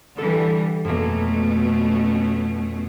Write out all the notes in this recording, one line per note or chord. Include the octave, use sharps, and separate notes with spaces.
D3 E3 G3 A4
F2 B2 A3 A#3 C#4